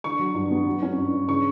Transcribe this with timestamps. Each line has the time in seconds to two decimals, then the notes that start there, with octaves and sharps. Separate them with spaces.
0.04 D3 C#6
0.19 F#3
0.35 G2
0.51 B3
0.67 F#3
0.83 C#4
0.98 G2
1.13 G2
1.28 C#3 C#6